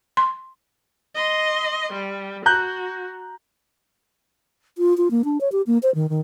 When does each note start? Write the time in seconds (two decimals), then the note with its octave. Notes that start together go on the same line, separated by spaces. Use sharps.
0.17 C6
1.15 D#5 C6
1.93 G3
2.46 F#4 A#5 F#6 G6
4.78 F4
4.97 F4
5.11 A#3
5.24 D4
5.41 C#5
5.52 G4
5.67 A#3
5.83 C5
5.95 D#3
6.09 D#3